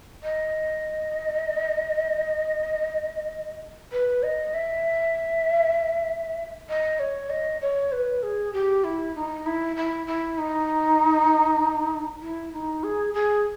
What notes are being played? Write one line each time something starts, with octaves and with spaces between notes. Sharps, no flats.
D#5
B4
D#5
E5
D#5
C#5
D#5
C#5
B4
G#4
G4
E4
D#4
E4
E4
E4
D#4
E4
D#4
G#4
G#4